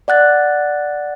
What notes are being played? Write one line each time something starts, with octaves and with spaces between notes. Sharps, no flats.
D5 F#5 F#6 A6